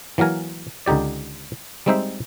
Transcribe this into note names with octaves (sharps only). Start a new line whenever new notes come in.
E3 F#3 A#3 A#4 G#5
C#2 D3 D#4 G4 D5
G3 G#3 C4 D#4 C5 E5